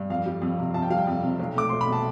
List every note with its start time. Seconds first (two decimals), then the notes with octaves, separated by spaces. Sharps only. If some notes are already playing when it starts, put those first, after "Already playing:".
Already playing: G2
0.10 F2 F5
0.26 G3
0.42 F2
0.58 C3
0.74 F2 A5
0.82 G5
0.90 G3 F5
0.98 G5
1.07 F2
1.23 C3
1.39 B1
1.55 A3 D6
1.69 B1 C6
1.81 B5
1.87 B2
1.93 A5